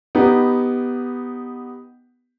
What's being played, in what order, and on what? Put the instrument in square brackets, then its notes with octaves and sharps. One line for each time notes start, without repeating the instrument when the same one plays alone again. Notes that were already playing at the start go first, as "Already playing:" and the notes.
[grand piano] B3 D#4 G4